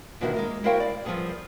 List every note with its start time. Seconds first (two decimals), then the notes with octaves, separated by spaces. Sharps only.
0.21 B2 D3 D#3 A#3 E4 F#4
0.34 G#3 A#3 A#4
0.64 E4 F#4 A#4 C5 F5 G5
0.80 D5
1.05 F3 G3 B3 G#4 A4